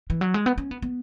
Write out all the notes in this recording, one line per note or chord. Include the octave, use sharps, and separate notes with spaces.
E3
F#3
G#3
B3
C#4
B3
B3